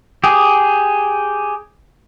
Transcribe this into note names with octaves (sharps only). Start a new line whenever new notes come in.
G4 G#4